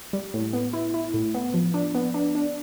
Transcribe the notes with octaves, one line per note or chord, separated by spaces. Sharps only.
G3
A2
B3
E4
E4
A2
B3
F3
D4
B3
D4
D4